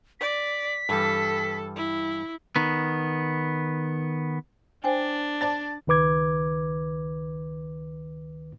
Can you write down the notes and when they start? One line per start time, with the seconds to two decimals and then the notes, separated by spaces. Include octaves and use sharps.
0.20 D5 B6
0.89 G2 E3 G3 A4
1.76 E4
2.56 D#3 B3
4.84 D4 C5 G5 G#5
5.41 D5 A5 A6
5.87 C#2 D#3 B4 D6 G#6